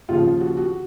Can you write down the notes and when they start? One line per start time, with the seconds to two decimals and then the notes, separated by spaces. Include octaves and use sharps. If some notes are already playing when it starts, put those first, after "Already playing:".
0.08 D#2 C#3 F3 F4
0.40 F#4
0.57 F#4